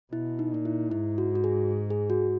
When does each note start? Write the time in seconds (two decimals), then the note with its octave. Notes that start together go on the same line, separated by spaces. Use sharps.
0.12 B2 E4
0.39 D#4
0.52 A#2 D#4
0.65 E4
0.91 G#2 E4
1.18 F#4
1.35 F#4
1.44 G#4
1.90 G#4
2.10 F#4